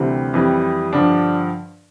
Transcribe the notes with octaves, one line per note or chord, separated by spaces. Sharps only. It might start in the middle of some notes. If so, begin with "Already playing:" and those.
Already playing: D2 C3 E3 G3 C4
F2 E3 G3
G2 D3 F3 D4